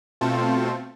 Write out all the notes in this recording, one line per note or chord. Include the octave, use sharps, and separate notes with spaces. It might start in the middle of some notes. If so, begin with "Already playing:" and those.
B2 A3 C4 F4 A4